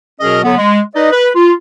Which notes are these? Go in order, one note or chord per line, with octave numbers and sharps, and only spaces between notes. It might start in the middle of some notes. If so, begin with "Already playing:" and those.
B2 F#3 C#4 G#4 A#4 D#5
D3 F#3 B3
G#3
D#4 B4 D5 D#5
B4
F4